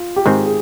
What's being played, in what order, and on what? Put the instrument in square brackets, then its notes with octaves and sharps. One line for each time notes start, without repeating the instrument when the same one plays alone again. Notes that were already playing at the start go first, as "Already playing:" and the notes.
Already playing: [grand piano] F4
G4
[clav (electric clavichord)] G#2 D#3 G#3 C4 [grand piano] G#4
[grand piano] G#4